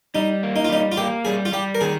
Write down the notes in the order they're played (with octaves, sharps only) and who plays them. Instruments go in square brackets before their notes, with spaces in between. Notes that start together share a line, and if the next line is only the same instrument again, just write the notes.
[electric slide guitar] G3 [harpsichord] D#4
[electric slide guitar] A#3
[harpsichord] D#4
F4
[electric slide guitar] G3 [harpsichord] D#4
[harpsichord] F4
[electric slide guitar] A#3 [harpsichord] G4
[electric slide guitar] G3 [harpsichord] G#4
[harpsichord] F4
[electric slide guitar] G3 [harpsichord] G4
[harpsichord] A#4
[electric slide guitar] D#3 [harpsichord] G#4